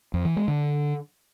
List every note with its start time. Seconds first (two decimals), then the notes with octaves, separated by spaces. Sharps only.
0.14 F2
0.25 E3
0.37 G#3
0.48 D3